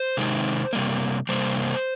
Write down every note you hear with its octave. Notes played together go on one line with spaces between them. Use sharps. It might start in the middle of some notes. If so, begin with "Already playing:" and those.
Already playing: C5
C3 D#3 G#3
C3 G3 A#3
C3 G3 A#3 C5